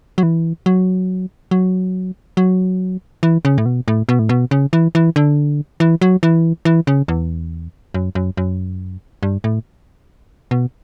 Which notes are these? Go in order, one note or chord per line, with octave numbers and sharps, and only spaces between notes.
F#3
E3
F#3
F#3
F#3
E3
C#3
A2
B2
A2
B2
A2
B2
C#3
E3
E3
D3
E3
F#3
E3
E3
C#3
E2
F#2
F#2
F#2
G2
A2
B2